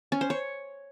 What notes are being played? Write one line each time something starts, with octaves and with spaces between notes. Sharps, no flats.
C#4
C5
C#5